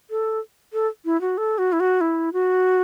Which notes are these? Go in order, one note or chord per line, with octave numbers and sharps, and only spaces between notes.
A4
A4
E4
F#4
A4
F#4
E4
F#4
E4
F#4